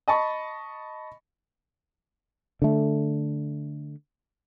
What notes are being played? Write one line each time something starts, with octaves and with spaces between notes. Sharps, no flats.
D#5 A5 B5 C#6
D3 A3